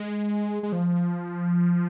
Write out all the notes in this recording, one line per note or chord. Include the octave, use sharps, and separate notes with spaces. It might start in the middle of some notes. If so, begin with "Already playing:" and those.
Already playing: G#3
G#3
F3